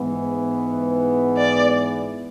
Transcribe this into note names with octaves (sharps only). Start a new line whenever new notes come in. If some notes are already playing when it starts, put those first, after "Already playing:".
Already playing: G#2 E3 B3
D5